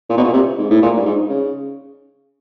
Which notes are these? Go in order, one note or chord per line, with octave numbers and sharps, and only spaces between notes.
A#2
B2
A#2
C3
G#2
A2
A#2
G2
G#2
C#3